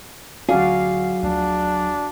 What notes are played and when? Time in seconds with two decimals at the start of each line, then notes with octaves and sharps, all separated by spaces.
0.49 D2 F#3 C#4 F#4 G#4 D5 F5
1.23 D2 F3 D4